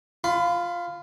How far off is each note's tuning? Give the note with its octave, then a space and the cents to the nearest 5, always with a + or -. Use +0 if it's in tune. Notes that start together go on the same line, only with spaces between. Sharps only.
F4 +0 B5 +30